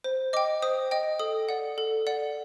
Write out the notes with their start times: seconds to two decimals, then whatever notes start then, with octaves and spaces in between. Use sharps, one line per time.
0.04 C5
0.33 D#5 G5 D6
0.62 C5 D#6
0.91 D#5 G5
1.19 A4 D#6
1.49 D5 F#5
1.78 A4
2.07 D5 F#5